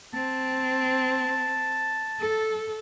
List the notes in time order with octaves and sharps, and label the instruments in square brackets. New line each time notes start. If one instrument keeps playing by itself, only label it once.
[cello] C4 [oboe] A5
[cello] A4